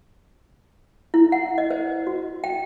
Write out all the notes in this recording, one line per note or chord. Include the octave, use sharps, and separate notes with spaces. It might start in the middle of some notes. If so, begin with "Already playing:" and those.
E4
F#5
D#5
C5
F#4
G5